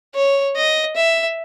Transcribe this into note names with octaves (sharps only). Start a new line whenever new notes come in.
C#5
D#5
E5